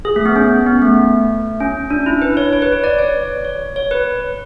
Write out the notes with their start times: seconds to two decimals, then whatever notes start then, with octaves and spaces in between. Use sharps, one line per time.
0.05 G#4
0.16 A3
0.26 B3
0.36 C#4
0.66 B3
0.82 A3
1.60 C#4
1.91 D4
2.06 E4
2.22 B4
2.37 C#5
2.52 C#5
2.62 B4
2.72 C#5
2.84 D5
2.99 C#5
3.45 C#5
3.76 C#5
3.91 B4